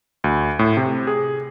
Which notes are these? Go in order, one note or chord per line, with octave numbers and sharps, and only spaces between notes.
D2
A2
C3
G#4